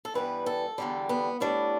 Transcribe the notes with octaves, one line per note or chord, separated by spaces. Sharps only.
A4
G2 E3 G3 B3 B4
A4
E2 D3 G3
B3
A2 G3 B3 D4